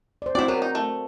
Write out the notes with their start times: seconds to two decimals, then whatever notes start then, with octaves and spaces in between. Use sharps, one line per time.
0.22 C5 D5
0.35 C4 E4 F#4 D5
0.48 F#3 B3 A#4
0.62 D#4
0.75 A3